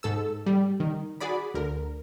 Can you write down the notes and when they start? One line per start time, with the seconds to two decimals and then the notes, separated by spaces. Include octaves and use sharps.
0.03 G#2 A4 E6
0.46 G3
0.80 D#3
1.20 F#4 G#4 D5 B5
1.54 D2 D3 A#4